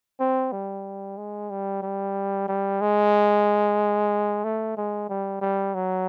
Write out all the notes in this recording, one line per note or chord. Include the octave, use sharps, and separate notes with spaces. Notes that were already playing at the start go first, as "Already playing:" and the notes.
C4
G3
G#3
G3
G3
G3
G#3
A3
G#3
G3
G3
F#3